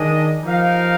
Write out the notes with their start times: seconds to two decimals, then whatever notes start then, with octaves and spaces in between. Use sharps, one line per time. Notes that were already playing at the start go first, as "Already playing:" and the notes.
Already playing: D#3 G#3 D4 G#4 D#5
0.43 F3 D#4 G4 A#4 F5